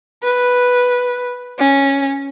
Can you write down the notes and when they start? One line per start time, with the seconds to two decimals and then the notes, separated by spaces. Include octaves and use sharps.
0.23 B4
1.58 C#4